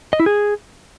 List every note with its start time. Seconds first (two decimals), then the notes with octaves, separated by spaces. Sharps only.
0.13 D#5
0.20 E4
0.26 G#4